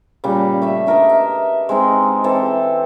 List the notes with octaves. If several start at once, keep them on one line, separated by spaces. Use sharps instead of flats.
A#2 C#3 G3
A3 E5
D4 A#4 B4 D#5
E5
G#3 C4 D#4
E3 C4 A4